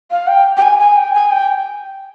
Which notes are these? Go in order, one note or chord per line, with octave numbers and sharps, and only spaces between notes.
F5
G5
G5
G#5
G#5
G5
G#5
G5